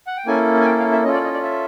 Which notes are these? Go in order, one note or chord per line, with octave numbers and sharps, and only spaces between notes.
F#5
G5
A#3 C#4 E4 A4 G#5
G#5
G5
F5
E5
C#4 F4 A4 D#5
D5
D#5
D5
E5